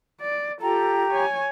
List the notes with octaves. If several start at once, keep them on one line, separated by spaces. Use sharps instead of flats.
D5
F4 G4 A4 G5 A#5
C#5 G#5